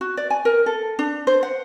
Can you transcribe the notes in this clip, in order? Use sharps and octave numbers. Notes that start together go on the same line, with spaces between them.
F#4
D5
G#5
A#4
A4
D4
C5
F#5